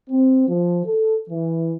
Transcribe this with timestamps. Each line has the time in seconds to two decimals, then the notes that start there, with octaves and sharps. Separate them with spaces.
0.10 C4
0.48 F3
0.85 A4
1.30 E3